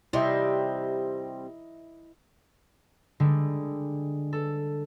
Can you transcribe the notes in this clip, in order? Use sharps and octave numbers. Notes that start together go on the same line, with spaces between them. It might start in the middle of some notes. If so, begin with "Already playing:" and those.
C3 G3 C4 E4 D#5 E5
D3 G3 G#3
A4